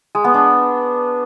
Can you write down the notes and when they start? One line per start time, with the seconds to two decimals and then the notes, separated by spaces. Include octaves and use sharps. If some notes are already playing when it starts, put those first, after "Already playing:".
0.15 G#3
0.24 B3
0.34 D4